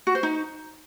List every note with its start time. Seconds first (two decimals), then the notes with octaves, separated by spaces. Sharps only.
0.07 F#4
0.15 C5
0.23 D#4